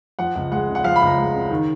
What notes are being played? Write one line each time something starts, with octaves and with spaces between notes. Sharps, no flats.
F3 F#5
C#2
G#3 F#5
C#3
F#5
F3 F5
B5
C#2
A#5
G#3
C#3
D#3